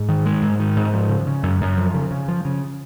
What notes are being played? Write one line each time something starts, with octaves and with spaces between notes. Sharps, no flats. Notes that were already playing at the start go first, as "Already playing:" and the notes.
Already playing: G#2
D#3
G#3
G#2
D#3
G#2
F3
C#3
C#3
F#2
F#2
F3
C#3
C#3
F3
C#3